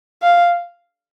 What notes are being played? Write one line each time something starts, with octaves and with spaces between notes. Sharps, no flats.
F5